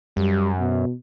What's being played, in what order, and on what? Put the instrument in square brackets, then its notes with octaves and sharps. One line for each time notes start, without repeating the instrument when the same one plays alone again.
[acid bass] F#2 [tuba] G3
[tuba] B2